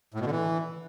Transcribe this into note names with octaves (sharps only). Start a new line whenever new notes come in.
A2
B2
D3
E3